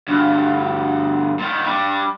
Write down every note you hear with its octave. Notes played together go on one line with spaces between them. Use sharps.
D2 G2
A#2 D#3
G3 D4